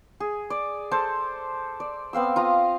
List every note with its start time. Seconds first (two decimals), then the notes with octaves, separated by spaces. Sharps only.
0.20 G#4
0.50 D5
0.91 A4 C5 A5
1.80 D5
2.13 B3 C4 F5 E6
2.36 F4 A#5 D#6